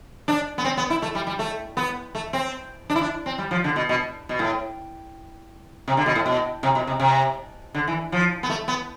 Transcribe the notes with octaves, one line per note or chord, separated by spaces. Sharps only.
D4
B3
C4
B3
E4
A3
G3
G3
A3
B3
A3
C4
D4
E4
D4
C4
G3
F3
D3
B2
B2
B2
A2
C3
D3
B2
A2
B2
C3
B2
C3
C3
D3
E3
F3
B3
A3
B3